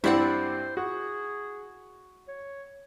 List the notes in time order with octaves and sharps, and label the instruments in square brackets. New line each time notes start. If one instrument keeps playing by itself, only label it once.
[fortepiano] G2 C4 [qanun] E4 D5 F#5 [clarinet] C5
[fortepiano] F#4 [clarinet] G#4
[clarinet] C#5